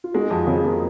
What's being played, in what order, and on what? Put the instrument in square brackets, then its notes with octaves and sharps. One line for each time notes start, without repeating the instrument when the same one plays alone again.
[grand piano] F4
[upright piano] G#3 [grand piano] D#4 F#4
[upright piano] F2
[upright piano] C#3 [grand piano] G#3 C4
[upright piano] F2 [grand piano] A#3